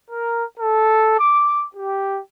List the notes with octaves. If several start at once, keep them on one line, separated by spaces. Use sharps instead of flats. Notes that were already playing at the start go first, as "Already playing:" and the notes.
A#4
A4
D6
G4